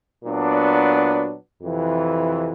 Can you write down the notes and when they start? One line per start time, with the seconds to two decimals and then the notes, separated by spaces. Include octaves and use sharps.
0.24 A#2 F#3 B3 D4
1.63 F2 C3 E3